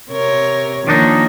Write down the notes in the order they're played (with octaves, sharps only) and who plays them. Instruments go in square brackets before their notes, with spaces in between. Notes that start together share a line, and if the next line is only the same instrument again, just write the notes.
[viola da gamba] C3 A#4 C#5
[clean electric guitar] D#3 D4 D#4 [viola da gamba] F3 A#3 C#5